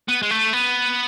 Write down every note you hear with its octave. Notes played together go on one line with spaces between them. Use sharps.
B3
G#3
A3
B3